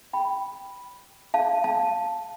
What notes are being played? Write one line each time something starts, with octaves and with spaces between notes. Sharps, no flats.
G5 B5
F5 A5
F5 A5